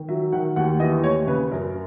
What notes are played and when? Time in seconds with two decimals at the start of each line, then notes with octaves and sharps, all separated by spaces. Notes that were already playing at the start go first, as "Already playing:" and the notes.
Already playing: D#3
0.09 F#3 E5
0.32 D#3 F#5
0.56 D#2 F#5
0.79 E3 D#5
1.03 D#2 C#5
1.27 C#3 B4
1.51 F#2 A#4